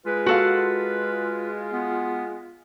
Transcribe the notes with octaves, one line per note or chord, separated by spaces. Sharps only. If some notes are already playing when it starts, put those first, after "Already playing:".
G#3 F4 B4
F#4 A4 F5
B3